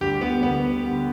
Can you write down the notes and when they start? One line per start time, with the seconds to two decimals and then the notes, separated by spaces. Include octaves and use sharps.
0.01 D2 D3 G3 G4
0.21 B3
0.42 D2 D3 G3 B3
0.84 D3 G3